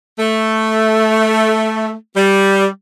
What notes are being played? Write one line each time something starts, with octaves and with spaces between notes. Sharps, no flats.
A3
G3